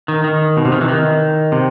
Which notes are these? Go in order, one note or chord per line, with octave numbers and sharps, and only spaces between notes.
D#3
D#3
B2
C3
D#3
E3
D#3
C3